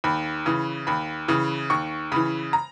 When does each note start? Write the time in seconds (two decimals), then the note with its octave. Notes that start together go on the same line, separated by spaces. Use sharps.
0.04 D#2 B5
0.46 C#3 E3
0.87 D#2 B5
1.28 C#3 E3
1.70 D#2 C#6
2.12 C#3 E3 B5
2.53 A#5